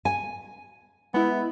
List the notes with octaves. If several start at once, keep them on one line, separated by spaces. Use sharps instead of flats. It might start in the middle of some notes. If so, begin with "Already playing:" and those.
G#5
G#3 B3 E4